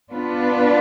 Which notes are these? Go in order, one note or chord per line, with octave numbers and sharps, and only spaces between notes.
B3 D4 F4 B4